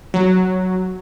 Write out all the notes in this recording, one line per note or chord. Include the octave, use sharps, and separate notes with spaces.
F#3